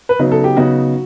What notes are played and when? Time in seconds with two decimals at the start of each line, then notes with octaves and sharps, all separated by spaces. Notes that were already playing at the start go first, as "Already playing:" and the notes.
0.09 B4
0.19 C#3 F#3 B3 D#4
0.32 A4
0.44 G4
0.57 C#3 F#3 B3 D#4 F#4